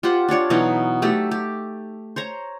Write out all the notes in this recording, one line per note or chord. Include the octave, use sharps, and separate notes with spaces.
F4 G4 C5 F#5
D4 F4 C#5 D5
B2 E3 F#3 D#4
F#3 A3 G4 A4
G4
C5 C#5 A#5